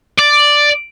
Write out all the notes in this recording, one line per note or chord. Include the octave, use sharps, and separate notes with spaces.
D5